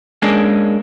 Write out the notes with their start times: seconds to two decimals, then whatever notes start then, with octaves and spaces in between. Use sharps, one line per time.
0.22 G#3 A#3 C#4 D4